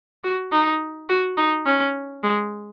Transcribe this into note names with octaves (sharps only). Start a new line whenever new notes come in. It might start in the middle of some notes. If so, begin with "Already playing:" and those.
F#4
D#4
F#4
D#4
C#4
G#3